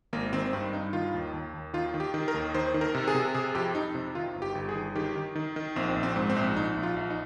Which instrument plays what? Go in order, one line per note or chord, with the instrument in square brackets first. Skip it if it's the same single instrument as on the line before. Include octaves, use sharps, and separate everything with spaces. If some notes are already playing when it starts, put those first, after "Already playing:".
[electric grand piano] G#1 A#3
D#3 C4
G2 C4
G2 D#4
D#3 F4
D#2
D#2
D#2
D#3 F4
D#3
G4
D#3
A#4
D#2
D#3 C5
D#3
A#4
C3
G#4
C3
C3 G#4
F2 G4
F2 D#4
C3
D#3 F4
G1
G4
G1
G#4
D#3
D#3 G4
D#3
D#3
D#3
A#1 C4
A#1
C4
G#2
C4
A#1
A#1 D#4
A#1
F4
A#1
D#4